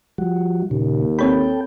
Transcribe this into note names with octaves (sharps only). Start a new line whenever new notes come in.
F3 G3 F#4
D#2 A#2 C#3
C4 A4 C#5 G5 B5